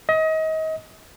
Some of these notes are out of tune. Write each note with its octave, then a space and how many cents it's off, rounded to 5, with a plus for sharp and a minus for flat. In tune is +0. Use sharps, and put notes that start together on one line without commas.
D#5 +30